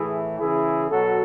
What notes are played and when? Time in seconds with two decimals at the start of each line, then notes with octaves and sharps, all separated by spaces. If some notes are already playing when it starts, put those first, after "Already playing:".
Already playing: A2 E3 E4 G#4
0.39 C#3 E3 E4 G#4
0.91 B2 F#3 F#4 A4